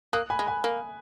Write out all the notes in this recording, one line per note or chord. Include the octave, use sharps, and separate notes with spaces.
A#3 D#6 F#6
G#5 B5
G#3
G#5 B5
A#3